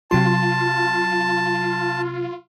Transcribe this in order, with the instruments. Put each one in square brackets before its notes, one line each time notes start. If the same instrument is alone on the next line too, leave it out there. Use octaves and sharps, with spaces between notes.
[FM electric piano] C3 F#3 C6 [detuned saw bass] F4 [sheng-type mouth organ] A5